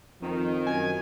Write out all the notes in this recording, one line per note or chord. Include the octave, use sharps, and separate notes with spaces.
F2 D#3 F3
F#2 G#5